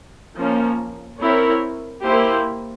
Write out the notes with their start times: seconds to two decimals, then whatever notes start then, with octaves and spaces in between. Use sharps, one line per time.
0.38 F3 A#3 C#4
1.21 C4 E4 A#4 C#5
2.04 A#3 E4 G4 C5